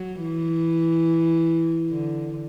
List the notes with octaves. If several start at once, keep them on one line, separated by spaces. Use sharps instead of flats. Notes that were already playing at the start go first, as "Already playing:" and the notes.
Already playing: F#3
E3
D3